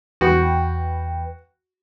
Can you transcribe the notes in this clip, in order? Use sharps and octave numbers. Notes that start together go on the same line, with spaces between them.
E2 F#4 B4 G5